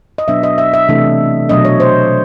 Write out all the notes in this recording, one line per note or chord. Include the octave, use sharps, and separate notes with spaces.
D#5
B2 F#3 B3 D4 E5
D#5
E5
E5
C3 E3 A3 D4
B2 F#3 A3 D4 D#5
C#5
C5